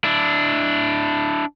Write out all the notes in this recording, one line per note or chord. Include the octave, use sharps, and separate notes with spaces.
D4 E4